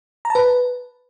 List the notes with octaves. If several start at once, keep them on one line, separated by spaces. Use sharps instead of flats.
A#5
A5
B4